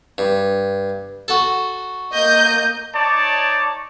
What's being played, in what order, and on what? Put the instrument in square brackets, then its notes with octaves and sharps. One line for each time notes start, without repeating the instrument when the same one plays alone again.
[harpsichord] G2
F#4 A4
[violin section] A#3 D#5 G6
[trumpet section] D#4 C#5 D5 A5